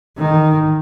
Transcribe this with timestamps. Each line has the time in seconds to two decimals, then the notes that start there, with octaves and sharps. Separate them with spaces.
0.18 D#3